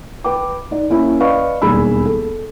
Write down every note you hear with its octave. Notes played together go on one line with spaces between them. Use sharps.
B4 G5 D6
D#4 D5
A#3 C#4 E4
B4 D5 D#5 F5 C#6
E1 D#2 G3 G#4 B5 E6
A4